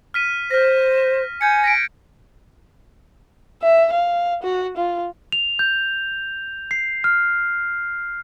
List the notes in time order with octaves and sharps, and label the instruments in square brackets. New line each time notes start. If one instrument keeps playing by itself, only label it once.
[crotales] F6 B6 D#7
[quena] C5 [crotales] F6 A#6
[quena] G#5 [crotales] G6 G#6 C#7
[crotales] A#6 B6 D7
[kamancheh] E5
F5
F#4
F4
[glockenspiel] F7
G6
C7
F6